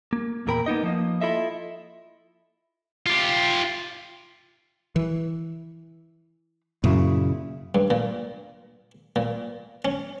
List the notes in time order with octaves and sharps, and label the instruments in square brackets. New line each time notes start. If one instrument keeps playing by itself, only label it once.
[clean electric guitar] A#3
E2 A#2 A#4 G5 B5
A#3 B3 D#4 D#5
F3 A#3 D#5
E4 F4 A4 D#5 E5
[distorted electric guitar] F4 G4
[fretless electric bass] E3
[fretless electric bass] F#2 [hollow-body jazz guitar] A#2 C#3 E4
[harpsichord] G2
A#2
A#2
C#4